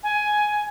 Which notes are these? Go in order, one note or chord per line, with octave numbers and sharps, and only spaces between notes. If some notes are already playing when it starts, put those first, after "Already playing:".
G#5